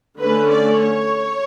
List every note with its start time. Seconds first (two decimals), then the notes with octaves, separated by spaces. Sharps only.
0.21 D3 A3 C#4 B4
0.51 D5
0.80 C#5